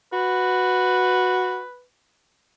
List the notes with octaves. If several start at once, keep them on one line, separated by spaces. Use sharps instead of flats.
F#4 B4